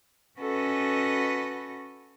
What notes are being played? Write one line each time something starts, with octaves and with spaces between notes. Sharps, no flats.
C#4 F#4 A4 B4 D#5